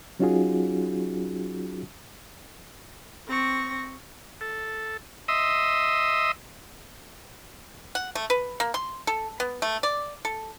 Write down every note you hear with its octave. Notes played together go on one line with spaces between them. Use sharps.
F#3 C#4 D#4 F4 F#4 G#4
C4 C#6 A#6
A4
D#5 E5 C6 D#6 E6
F#5
A3
B4
A#3
C6
A4
B3
A3
D5
A4